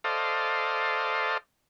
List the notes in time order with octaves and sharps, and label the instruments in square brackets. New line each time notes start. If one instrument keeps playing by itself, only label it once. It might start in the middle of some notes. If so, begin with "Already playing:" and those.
[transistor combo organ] A4 C5 D5 D#5 F5